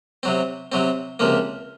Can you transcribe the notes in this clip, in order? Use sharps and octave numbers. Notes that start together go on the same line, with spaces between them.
C3 F#3 C4
C3 F#3 C4
C#2 C3 F3 A#3